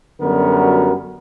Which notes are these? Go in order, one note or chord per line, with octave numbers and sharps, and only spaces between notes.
F#2 D3 G3 B3 F#4 A#4